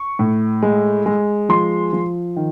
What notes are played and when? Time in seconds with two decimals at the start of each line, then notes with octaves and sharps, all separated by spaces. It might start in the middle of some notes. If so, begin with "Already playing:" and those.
Already playing: C#6
0.19 A2
0.63 G#3
1.06 G#3
1.49 F3 C6
1.93 F3
2.36 D#3